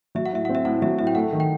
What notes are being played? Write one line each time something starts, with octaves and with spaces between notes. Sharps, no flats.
F#3 E5
F#5
A2 E5
C4 F#5
E5
A2 F#5
F#3 E5
A2 E5
G5
A3 F#5
D#3
G5